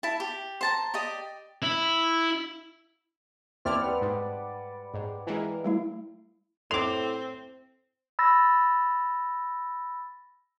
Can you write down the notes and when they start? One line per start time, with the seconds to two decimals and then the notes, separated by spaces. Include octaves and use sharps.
0.03 E4 A5
0.20 G4
0.61 C5 A5 A#5
0.94 G4 D5 D#5 D#6
1.62 E4
3.65 D#2 C4 E4 D5 A5 F6
3.81 G3 B4 F#5
4.01 G#2
4.94 G#2
5.27 E3 G#3 A#4 F5
5.64 G3 A3 E4
6.71 A2 C4 C6 D6 F7
8.19 B5 E6 A6 A#6